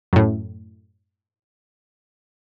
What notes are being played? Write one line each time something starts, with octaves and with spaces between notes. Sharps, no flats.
F#2 A2